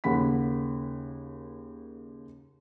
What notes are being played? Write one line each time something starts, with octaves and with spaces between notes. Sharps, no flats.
D#2 C#3 A#3 F#5 B5 B6